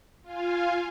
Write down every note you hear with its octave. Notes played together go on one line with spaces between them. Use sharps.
F4 F5 G#5